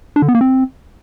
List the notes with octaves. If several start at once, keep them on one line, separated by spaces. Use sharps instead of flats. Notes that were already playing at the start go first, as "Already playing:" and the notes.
D4
D3
B3
A#3
C4